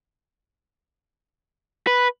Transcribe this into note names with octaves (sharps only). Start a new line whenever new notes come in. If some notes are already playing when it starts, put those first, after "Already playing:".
B4